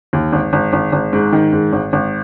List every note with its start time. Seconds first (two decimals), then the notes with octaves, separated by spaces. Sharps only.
0.13 D#2
0.33 G#1
0.53 G#1
0.73 G#1
0.92 G#1
1.13 G#2
1.33 D#3
1.53 G#2
1.73 G#1
1.93 G#1